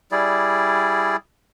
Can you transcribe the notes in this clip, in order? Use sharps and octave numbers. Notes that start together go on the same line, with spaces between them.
G3 E4 G#4 D5